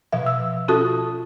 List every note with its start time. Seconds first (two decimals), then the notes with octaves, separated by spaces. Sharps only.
0.12 B2 F3 E5 F5
0.26 E6
0.68 C#4 F4 F#4 A4 A5 D#6